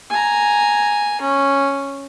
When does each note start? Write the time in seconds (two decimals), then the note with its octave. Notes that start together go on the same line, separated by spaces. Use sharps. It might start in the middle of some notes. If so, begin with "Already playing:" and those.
0.10 G#5 A#5
1.21 C#4